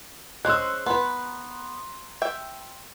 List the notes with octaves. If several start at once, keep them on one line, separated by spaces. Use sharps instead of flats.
G#3 C#4 C5 E6 F#6
B3 B4 A#5 C6
E5 G5